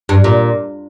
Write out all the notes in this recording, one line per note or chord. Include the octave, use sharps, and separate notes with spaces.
G2
A#2